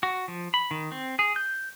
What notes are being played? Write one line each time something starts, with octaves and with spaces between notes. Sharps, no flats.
F#4
F3
B5
D#3
C4
G#4
G6